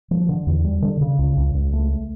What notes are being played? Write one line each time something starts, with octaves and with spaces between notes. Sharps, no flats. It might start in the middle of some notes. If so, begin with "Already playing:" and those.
F3
D3
E2
G3
D3
C#3
C#2
C#2
C#2
A3